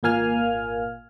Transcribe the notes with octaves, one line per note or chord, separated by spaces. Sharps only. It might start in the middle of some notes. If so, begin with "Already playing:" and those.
G#1 A#2 A#3 F5 G#5 F6